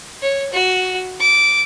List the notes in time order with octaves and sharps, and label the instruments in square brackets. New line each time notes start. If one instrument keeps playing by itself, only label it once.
[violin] C#5
F#4
D6